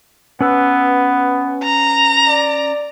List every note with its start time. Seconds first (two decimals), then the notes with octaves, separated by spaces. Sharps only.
0.41 B3 C#4 B4 E6
1.64 A#5
2.28 D5